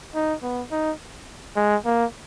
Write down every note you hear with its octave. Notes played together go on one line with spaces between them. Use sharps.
D#4
B3
D#4
G#3
A#3